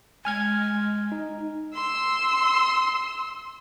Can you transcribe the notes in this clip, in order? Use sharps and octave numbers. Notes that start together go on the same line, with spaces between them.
G#3 G#5 F6 G#6
D#4
C6 E6